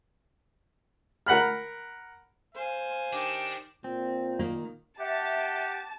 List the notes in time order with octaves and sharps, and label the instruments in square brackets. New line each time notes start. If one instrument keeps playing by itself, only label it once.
[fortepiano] A#4 F#5 B5 F6
[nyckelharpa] C5 G#5 [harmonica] F5
[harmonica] D#3 G4 D6 [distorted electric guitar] D4
[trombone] A#2 [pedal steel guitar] C4
[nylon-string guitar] D#3 A#3
[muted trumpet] G4 [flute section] E5 [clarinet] F#5 [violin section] A5